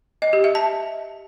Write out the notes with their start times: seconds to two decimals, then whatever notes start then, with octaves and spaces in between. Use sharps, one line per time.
0.22 D#5
0.33 G4
0.44 E5
0.55 A5